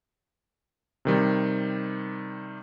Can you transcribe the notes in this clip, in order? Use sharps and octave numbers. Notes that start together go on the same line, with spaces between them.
C3 D#3 G3